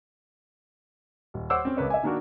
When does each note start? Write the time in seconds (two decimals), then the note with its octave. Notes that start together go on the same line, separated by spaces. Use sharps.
1.34 D#1
1.50 C5 C#5 F#5 D6 E6
1.65 C4 C#4
1.77 C#2 A#4 B4 C#5
1.90 E5 G#5
2.03 D#3 A#3 D4 F#4 A#4